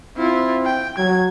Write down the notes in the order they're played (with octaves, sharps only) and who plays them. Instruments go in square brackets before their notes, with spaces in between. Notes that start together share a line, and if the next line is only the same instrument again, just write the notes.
[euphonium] C4 [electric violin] E4 F4
[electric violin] G5
[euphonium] F#3 [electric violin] G#6